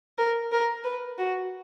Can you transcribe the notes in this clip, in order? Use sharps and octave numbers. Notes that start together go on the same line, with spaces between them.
A#4
A#4
B4
F#4